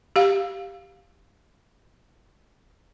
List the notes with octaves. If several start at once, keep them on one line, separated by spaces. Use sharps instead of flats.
G4 F5